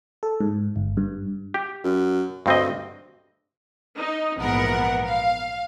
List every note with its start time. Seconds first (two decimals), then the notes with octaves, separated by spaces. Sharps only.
0.23 A4
0.40 G#2
0.76 G1
0.97 G2
1.54 G4
1.84 F#2
2.46 D2 G2 C4 D#5
3.97 D#4
4.37 A#1 G#2 E3 B3 A#4 F#5
5.06 F5